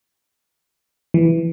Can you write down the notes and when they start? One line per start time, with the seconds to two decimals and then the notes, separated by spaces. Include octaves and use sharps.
1.14 E3